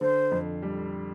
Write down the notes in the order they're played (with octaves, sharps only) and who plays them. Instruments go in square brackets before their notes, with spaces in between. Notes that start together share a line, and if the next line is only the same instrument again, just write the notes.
[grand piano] D3 [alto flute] C5
[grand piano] F2
G3